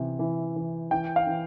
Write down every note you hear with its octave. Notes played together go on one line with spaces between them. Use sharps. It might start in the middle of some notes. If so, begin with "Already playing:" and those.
Already playing: C3 E3
E3
E3
E3 G5
F5
E3